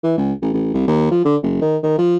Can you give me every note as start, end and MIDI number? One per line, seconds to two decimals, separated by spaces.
0.03 0.16 52
0.18 0.33 37
0.42 0.49 33
0.53 0.72 33
0.74 0.83 36
0.88 1.09 39
1.11 1.24 53
1.25 1.36 50
1.43 1.58 30
1.61 1.77 51
1.83 1.94 51
1.98 2.17 53